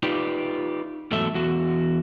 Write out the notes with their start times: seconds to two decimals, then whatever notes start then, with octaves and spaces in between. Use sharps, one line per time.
0.03 D#4 F4 G4 B4 D5
1.11 E2 G#2 F#3 A3 A4 E5
1.34 E2 F#4